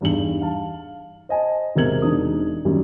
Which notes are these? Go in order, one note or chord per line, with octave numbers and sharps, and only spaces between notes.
E2 G2 D#4 G#4 F#7
F5 A5
C5 D#5 G#5 A5
E1 C3 A#4 G#6 F#7
E1 D4 D#4 D#6
F#2 D#3 G3